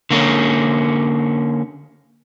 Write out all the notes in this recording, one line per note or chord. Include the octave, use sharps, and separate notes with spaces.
D3 A#3 C4 C#4